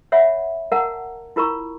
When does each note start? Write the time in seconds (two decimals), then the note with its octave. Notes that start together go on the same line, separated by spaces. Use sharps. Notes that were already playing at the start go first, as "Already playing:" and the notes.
0.12 C#5 E5 F#5 B5
0.72 A#4 F5 F#5 A5 A#5
1.36 E4 F4 A#4 A#5 B5 C#6